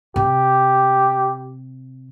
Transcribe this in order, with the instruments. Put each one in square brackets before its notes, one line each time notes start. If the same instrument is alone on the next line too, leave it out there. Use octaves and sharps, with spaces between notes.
[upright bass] C3 [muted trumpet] G4